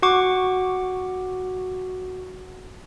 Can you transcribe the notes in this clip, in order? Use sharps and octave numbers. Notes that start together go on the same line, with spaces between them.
F#4 F#5 C#6 D6